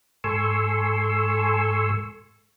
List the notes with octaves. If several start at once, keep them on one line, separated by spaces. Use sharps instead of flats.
G#2 A4 G#5 C6 C#6 E6